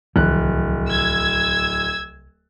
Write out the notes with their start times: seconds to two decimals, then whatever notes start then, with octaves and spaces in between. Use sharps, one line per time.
0.16 D1 C2 D#3 F3 F#6
0.88 E6 G#6